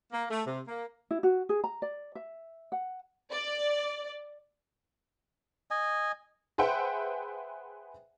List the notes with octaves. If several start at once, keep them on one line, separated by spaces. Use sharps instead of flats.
A#3
A3
C3
A#3
E4
F#4
G#4
A#5
D5
E5
F#5
D5
D#5 G#5
G#4 B4 C5 E5 F#5 G5